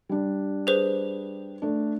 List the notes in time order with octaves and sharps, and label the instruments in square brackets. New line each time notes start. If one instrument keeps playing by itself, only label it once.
[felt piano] G3 D4
[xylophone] G#4 B4 C5
[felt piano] A3 D4